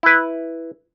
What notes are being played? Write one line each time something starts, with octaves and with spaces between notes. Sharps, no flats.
E4 B4